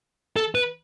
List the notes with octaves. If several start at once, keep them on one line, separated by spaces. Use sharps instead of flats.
A4
B4